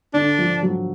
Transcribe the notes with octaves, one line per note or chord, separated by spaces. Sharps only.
D3 D4
F3
F#3